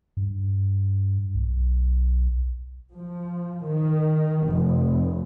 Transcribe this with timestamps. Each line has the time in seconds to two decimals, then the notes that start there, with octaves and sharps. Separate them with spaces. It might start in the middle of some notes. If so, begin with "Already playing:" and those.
0.17 G2
1.35 B1
2.93 F3
3.63 D#3
4.46 F1